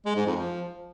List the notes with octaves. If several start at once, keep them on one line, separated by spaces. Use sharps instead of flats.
G#3
G#2
F2
F3